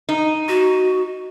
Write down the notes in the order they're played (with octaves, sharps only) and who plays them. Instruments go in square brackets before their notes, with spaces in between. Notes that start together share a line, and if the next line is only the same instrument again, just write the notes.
[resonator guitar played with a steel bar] D#4
[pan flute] F#4